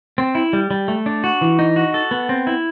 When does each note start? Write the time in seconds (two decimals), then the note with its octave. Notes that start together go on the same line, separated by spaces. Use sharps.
0.18 C4
0.35 E4
0.53 G3
0.71 G3
0.88 A3
1.06 D4
1.24 F#4
1.41 E3
1.59 D#4
1.76 F#4
1.94 A4
2.11 B3
2.29 C4
2.47 E4